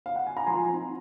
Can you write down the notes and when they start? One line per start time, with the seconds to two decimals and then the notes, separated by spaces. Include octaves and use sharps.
0.06 F5
0.16 F#5
0.27 G#5
0.37 A#5
0.47 F3 G#5 C6
0.69 C4 D#4